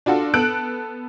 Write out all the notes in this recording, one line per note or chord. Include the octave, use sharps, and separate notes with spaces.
D4 F4 F#4 A4
B3 A4 F#6 D7